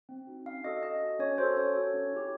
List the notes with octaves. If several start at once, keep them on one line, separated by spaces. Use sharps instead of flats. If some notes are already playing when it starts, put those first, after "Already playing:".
C4
D#4 F#4
C#4 F5
F#4 A4 D#5
C#4 D#5
F#4 A4
C#4 C#5
F#4 A4 C5
C#4 C#5
F#4 A4
C#4
E4 G4